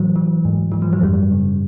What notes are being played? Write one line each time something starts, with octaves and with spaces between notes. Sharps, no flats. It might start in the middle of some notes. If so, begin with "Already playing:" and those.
Already playing: A2 E3 F#3
E3
G#2
G#2 E3
F3
F#3
F#2 G3
C#3